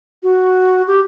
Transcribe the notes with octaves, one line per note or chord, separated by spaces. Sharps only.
F#4
G4